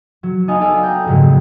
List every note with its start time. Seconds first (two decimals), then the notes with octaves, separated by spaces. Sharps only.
0.23 F#3
0.48 B3 D#4 D#5 F5 G#5 A5
0.61 A4 D5 F5 G#5
0.81 F#5 G5 A#5
1.06 F2 G#2 C#3 F#3 G#3 A#3